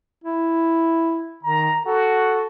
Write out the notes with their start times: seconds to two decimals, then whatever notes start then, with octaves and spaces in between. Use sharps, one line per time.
0.24 E4
1.43 D#3 A#5
1.85 F#4 A4